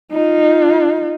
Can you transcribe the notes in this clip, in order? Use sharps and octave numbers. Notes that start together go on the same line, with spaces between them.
D#4 F4